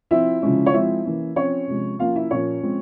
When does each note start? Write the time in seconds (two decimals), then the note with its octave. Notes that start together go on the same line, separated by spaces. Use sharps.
0.11 F3 C4 E4 E5
0.42 C#3 F3 G#3 C#4
0.66 C#5
0.73 F3 G#3 C4 E4 E5
1.05 E3 A#3 C#4
1.36 F3 C4 C#4 C#5
1.67 C3 F3 G#3
1.99 F3 A#3 C#4 F4 F5
2.16 E4 E5
2.31 A#2 F3 A#3 C#4 C#5
2.62 F3 G#3 C4